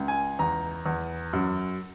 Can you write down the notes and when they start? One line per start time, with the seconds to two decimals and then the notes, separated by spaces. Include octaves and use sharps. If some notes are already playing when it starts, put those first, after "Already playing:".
Already playing: C#2
0.08 G#5
0.39 E2 A#5
0.86 E2
1.33 F#2